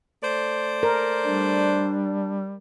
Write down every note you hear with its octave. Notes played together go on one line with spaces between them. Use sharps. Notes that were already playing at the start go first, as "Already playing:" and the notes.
A3 C5 D5
A#4
G3 D4